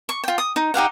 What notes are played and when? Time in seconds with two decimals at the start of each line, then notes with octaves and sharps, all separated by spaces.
0.09 C#6
0.24 F4 G5
0.38 D#6
0.56 D#4
0.74 D#4 G4 F5 F#5